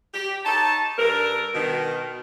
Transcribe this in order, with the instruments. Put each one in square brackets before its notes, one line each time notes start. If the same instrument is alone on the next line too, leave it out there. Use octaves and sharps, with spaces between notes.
[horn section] G4
D#4 C#5 A5
G2 A4 A#4
B2 D#3